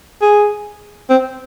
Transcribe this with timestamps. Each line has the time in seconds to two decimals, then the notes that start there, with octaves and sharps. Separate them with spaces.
0.22 G#4
1.10 C4